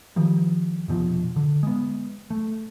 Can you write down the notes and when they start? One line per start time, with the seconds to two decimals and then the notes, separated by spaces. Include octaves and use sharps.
0.16 D#3 F3 G3
0.88 F1 B2 F3
1.36 D3
1.63 G#3 B3
2.30 A3